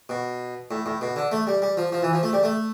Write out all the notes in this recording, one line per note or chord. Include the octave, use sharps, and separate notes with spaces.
B2
A2
A2
B2
D3
A3
G3
G3
F3
F3
E3
F3
A3
G3
A3